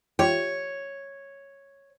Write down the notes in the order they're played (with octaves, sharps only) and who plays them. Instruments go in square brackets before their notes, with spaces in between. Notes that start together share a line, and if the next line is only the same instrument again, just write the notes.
[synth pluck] F4 G4 G5 [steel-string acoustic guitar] C#5